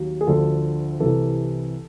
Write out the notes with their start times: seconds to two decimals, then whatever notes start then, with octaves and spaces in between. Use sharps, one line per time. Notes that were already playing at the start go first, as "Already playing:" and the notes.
Already playing: D#2 F#3
0.21 G#4
0.27 D2 D3 F3 A4
1.00 C2 C3 E3 A4